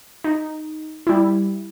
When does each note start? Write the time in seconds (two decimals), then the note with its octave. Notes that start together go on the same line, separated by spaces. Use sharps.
0.24 D#4
1.07 G3 E4